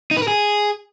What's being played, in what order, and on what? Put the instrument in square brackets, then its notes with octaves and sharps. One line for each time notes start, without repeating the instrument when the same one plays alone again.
[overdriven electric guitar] D#4
B4
A#4
G#4